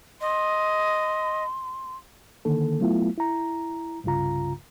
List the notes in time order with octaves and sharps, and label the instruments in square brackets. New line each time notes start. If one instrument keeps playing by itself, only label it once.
[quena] D#5 [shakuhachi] C6
[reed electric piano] D3 D#3 A#3 A4
F#3 A3 B3 E4 F4
E4 A#5
C2 G2 C#3 F4 A#5